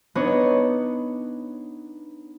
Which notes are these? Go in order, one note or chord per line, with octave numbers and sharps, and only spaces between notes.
B3 D4 D#4 C#5